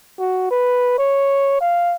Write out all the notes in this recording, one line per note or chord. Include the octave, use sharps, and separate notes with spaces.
F#4
B4
C#5
F5